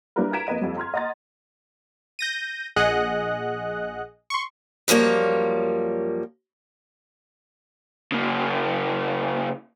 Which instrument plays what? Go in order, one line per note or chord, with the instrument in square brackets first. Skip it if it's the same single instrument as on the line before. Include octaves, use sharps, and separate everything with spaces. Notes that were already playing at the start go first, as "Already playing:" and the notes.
[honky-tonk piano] G3 D4 E4 F4 A#4 B4
A#5 G#6 B6 D7 E7
F2 A#3 B4 D#5 D#7
F2 G3
A#5 C6 F6 G#6
D#5 F#5 A#5 C6 A6
[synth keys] G6 A#6 D#7
A#1 G#4 D#5 F#5 F#6
C6 C#6
[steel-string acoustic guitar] F#2 F3 G3 A#3 C#5
[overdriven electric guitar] C#3 A#3